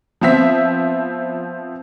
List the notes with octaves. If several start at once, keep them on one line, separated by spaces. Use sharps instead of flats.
F3 B3 C4 E5 B6